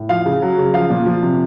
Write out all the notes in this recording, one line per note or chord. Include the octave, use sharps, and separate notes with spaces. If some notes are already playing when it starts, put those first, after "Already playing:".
Already playing: A2
F3 F5
C#3
F#3
C#3
F3 F5
A#2
F3
C3